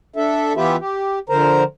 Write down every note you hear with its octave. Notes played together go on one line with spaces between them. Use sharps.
D4 A4 E5
E3 B3 F4 G4 B4 E5
G4
D3 F3 A#4 C5 A#5